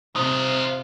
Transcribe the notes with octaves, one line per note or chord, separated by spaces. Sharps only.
C3 F3 D#4 F4 D#6